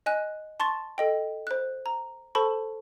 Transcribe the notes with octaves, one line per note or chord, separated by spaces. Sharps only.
D#5 G#5 F#6
A5 C6 C#6 A6
A4 D#5 G5
C5 F#6
A#5
A4 C5 A5 B5 C#6